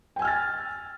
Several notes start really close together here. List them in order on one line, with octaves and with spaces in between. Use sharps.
G5 G#5 E6 F6 A6